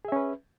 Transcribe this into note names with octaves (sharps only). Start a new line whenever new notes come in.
C#4 G#4 B4 E5